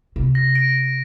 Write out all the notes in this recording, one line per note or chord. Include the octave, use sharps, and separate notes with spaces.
C3
A#6
A#6 D7